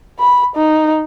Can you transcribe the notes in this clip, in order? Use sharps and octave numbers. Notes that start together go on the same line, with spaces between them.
B5
D#4